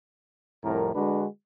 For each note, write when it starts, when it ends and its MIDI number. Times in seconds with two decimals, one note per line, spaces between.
0.64 0.90 36
0.64 0.90 41
0.64 0.90 45
0.64 0.90 70
0.95 1.25 50
0.95 1.25 56
0.95 1.25 62
0.95 1.25 66
0.95 1.25 71